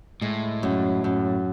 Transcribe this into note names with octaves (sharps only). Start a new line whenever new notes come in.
A2 G#3
F#2
F#2